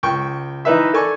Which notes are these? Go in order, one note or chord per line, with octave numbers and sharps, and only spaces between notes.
C#2 G5 C#6
E3 D#4 B4 E5
A4 D5 G#5 C#6